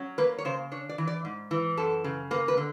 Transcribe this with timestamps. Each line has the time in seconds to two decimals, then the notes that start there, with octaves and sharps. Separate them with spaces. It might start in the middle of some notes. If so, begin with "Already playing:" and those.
Already playing: F#3 C#4
0.18 A#3 B4
0.38 C#5
0.45 C#3 C5
0.72 D4 C#5
0.89 D5
0.98 E3
1.07 D5
1.25 G#2
1.51 E3
1.77 F#2 A4
2.04 C#3
2.31 A#3 B4
2.48 B4
2.57 D3